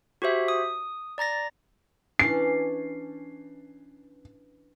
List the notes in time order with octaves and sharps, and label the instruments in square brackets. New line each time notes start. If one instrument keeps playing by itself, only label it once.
[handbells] F#4 G4 C5 E5
D#6
D5 A#5 A6 A#6
[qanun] E3 C#4 D4 [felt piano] C7